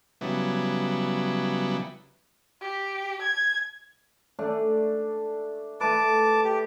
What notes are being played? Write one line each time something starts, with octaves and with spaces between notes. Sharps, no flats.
C#3 F#3 G3 B3 E4
G4
G#6
A3 D4 D5
A3 B4 A5 D6
G4